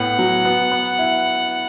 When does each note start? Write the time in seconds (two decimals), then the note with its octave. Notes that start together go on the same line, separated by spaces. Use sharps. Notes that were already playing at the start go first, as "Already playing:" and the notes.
Already playing: A2 B3 F#5
0.19 F#3
0.45 B3
0.71 B3
0.99 E4